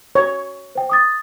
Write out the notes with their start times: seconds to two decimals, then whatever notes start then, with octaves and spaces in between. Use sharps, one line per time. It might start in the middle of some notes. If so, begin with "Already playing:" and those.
0.15 C#5
0.75 C5 G5
0.90 D6 D#6 A6